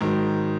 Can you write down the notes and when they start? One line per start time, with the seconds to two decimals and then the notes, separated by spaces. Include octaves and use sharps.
0.01 G#2 D#3 F#3